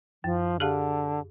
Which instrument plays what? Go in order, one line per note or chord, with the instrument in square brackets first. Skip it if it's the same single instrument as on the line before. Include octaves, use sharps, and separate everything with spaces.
[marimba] F#2 [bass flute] F3
[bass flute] D3 [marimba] G4 G#4 F5